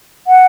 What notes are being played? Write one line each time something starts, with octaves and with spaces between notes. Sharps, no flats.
F#5